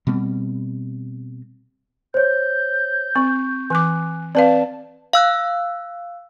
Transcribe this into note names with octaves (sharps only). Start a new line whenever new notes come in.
B2 G3 B3 C4
C5 C#5 G6
C4 C#6
E3 G#5 D6 F#6
C4 B4 D5 F5 A5
F5 E6 F#6